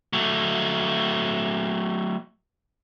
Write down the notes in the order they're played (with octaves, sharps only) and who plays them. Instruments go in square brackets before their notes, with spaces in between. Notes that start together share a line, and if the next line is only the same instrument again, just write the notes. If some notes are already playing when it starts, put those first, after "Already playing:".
[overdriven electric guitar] F#3 A3